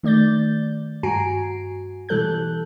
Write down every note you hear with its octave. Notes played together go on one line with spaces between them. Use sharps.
D#3 A3 D5 G6 A6
G2 F#4 G#5 A#5 C7 D7
B2 E3 G3 A4 F#6 G6